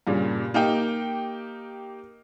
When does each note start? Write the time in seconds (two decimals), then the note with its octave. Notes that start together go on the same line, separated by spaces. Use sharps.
0.07 G2 A#2 C#3
0.54 A#3 D#4 G4 G5